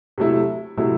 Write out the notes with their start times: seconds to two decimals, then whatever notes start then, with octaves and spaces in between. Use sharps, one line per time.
0.18 C3 F#3 A3 E4
0.77 C3 F#3 A3 E4